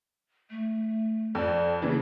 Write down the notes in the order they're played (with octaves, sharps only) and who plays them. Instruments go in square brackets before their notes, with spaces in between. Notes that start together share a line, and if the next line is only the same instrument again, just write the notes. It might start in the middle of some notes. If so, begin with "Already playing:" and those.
[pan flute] A3
[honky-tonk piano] F2 [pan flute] D5
[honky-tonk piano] C#3 E3 [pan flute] A#3